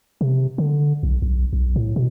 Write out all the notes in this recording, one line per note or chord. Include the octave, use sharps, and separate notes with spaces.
C3
D3
B1
B1
B1
A2
B2